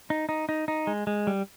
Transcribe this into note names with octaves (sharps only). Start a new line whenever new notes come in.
D#4
D#4
D#4
D#4
G#3
G#3
G3